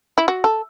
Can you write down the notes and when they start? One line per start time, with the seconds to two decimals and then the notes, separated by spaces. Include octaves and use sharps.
0.18 E4
0.28 F#4
0.44 A4